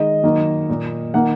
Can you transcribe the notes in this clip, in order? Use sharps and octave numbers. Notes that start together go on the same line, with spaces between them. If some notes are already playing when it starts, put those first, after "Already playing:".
Already playing: D#3 G#3 D#5
D#3 F#3 A#3
A#2 A#3
D#3 A#3 F#5